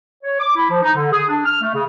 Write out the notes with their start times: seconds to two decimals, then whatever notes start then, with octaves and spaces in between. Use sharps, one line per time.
0.24 C#5
0.40 D6
0.56 E4
0.70 F3
0.82 D#4
0.95 D3
1.12 G#4
1.28 D4
1.45 F6
1.61 A3
1.73 C#3